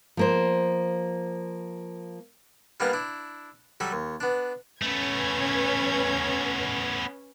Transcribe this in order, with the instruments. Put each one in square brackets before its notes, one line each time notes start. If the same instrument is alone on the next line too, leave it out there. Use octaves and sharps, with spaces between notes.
[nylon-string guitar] F3 A#3 C5
[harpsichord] G3 A#3 B3 D4 D#5 F5
D4 E4
F#3 G3 A4 B5
D#2
B3 D4
[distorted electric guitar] A3 B3 [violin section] C#4 B4 G#6